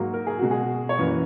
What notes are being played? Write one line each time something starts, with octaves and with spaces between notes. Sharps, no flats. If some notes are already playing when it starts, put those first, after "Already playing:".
Already playing: G#2 F#3 A#3 F#4
A#4
G#4
B2 G#3 F#4
G#4
C#5
F#2 E3 A#3 B4